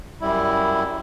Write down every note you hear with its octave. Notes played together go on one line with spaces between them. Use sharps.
F#2 G3 E4